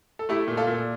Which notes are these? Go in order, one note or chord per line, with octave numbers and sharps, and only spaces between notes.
A4
A3 E4 G4
A#2
F4 A4
A#2